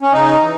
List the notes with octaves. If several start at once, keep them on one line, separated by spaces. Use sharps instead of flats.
C#4
C#3 D#4
E3